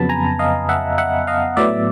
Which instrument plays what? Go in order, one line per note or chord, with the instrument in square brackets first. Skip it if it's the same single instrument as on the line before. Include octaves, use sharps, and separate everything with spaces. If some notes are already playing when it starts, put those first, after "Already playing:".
Already playing: [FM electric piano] F2 C#3 F#3 B3 A5 B5
G#5 A#5
D#5 F5
E5 F#5
E5 F#5
D#5 F5
A2 F#3 B3 D5 E5